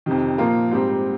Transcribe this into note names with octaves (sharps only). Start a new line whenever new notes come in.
F2 C3 D#3
A#2 F3 A#3 F4 A#4
G#2 G3 C4 G4